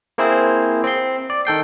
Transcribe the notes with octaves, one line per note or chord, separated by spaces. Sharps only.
A#3 C4 E4 G#4 C5
C4 C6
D5
D#3 A4 G5 C7